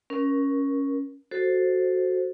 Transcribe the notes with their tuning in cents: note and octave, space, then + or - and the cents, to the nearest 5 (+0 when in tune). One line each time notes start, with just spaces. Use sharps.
C#4 +0 A#4 +20
F#4 +0 A4 +0 C5 +0